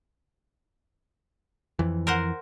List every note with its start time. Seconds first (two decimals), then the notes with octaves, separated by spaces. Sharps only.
1.79 F2 E3
2.07 A#4 C5 F#5